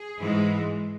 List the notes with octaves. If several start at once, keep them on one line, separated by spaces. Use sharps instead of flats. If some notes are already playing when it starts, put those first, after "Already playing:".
Already playing: G#4
G#2 E3 G#3